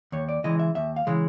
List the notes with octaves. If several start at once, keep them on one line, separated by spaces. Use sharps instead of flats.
D#2 C#5
D5
C#3 E3 G#3 D#5
E5
D#2 E5
F5
C#3 E3 G#3